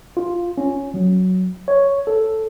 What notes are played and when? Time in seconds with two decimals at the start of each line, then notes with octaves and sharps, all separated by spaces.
0.17 F4
0.58 C#4
0.94 F#3
1.68 C#5
2.07 A4